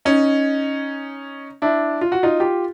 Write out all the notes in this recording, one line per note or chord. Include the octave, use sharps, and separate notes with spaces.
C#4 D#4
D4 E4
F4
F#4
D#4 F4
F4 G4